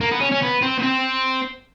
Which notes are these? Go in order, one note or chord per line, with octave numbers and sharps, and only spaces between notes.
A#3
B3
C#4
C#4
B3
C4
B3
C4